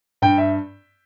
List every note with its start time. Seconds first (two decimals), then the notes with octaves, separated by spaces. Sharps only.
0.22 G2 G5
0.38 E5